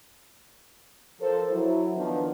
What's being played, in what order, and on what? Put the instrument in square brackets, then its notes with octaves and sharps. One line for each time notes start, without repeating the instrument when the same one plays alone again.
[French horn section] F3 A4 A#4 C5
F#3 E4
D#3 F3 B3 D4